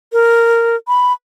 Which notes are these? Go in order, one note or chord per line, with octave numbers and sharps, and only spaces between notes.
A#4
B5